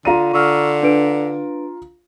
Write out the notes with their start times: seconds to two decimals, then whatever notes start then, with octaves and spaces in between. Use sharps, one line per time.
0.05 D3 F4 A#5 D#7
0.33 D3 C#6 E6 F6
0.83 D4 B4 D7